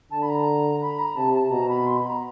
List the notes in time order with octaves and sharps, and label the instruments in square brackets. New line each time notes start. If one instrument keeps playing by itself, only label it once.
[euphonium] D3 [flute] A5
[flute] B5
A#5
B5
A#5
[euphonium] C3 [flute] A5
[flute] A5
[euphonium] B2 [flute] A#5
[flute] B5
C6
B5
A#5